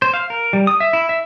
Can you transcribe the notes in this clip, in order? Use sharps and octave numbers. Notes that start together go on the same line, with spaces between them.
C5
F5
A#4
G3
D#6
E5
E4
E5